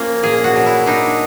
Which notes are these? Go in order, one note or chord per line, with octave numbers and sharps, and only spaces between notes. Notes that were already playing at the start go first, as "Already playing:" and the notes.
Already playing: F3 A#3 C#4
A#2 G#4
F#4
F#3
E4
D4 D#4